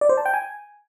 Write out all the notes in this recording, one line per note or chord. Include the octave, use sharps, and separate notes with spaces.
D5
C5
A5
G5
G#5